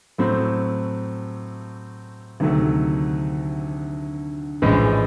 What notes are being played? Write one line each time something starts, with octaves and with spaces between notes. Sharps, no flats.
A2 F#3 A3 C4
D2 C3 D#3 F#3 A3
A#1 A2 E3 G#3 C#4